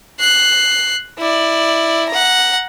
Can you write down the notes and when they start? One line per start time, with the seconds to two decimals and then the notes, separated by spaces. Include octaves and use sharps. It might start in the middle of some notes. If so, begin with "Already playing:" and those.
0.20 F#6 C7
1.19 E4 D5
2.10 F#5 A#5